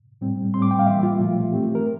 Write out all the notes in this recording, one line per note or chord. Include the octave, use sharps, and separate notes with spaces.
A2 G3 C4
A2 G3 C4 C6
D6
G5
F5
E3 G3 A#3 E5
F4
A#2 F3 A3
E3 A3 C4 G4
A#4